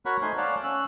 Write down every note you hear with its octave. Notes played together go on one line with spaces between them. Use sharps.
F#4 A#4 C#5 F#5 B5 C#6
A3 D#4 C5 G#5 C6
C#5 D5 F5 F#5 A5
C#4 E6 F#6